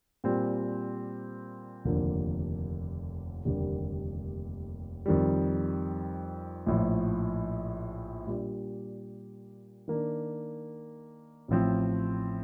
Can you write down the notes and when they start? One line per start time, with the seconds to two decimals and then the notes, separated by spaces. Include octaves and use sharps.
0.24 A#2 G3 C4
1.84 F1 D#2 D3 F3 A#3
3.45 F1 D#2 D3 G3 A#3
5.06 F2 D#3 G3
6.66 A#1 A2 F3
8.27 A#2 G3 D4 G4
9.88 D#3 A#3 D4
11.48 A1 A2 F3 C4